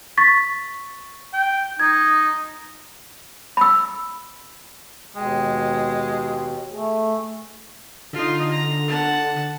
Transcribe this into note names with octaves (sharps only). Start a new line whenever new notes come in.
C#6 A6 B6
G5
D#4 G#6
B5 E6
D#2 B2 G#3 G5
A3 G#4
D3 D#4 F4
A#5
F#5 A5